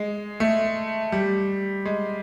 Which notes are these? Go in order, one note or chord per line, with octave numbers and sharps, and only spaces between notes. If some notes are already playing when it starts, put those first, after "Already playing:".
Already playing: G#3
A3
G3
G#3